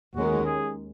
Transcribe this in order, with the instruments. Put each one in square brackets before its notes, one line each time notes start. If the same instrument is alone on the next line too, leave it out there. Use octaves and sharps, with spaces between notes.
[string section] D#2 D#3 G#3 C#4 A#4 [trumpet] F#4
[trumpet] G#4